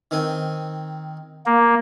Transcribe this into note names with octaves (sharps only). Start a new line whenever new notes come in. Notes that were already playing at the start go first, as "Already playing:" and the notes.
D#3 C4 G#5
A#3